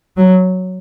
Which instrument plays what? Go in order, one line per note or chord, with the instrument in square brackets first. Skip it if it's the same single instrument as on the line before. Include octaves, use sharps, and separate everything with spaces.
[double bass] F#3